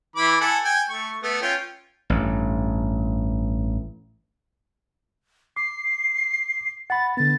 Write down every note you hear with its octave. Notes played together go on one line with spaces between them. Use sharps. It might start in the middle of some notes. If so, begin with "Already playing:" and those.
E3 B5 D6
A4 F#5 G#5
G5 G#5
A3 C#6
A3 B3
C#4 F4 G5
A1 G2
D6 C7
F#5 B5 A6
D3 B3 A6